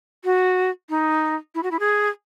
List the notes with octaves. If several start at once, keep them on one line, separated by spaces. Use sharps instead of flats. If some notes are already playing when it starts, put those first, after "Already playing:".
F#4
D#4
E4
F#4
E4
G#4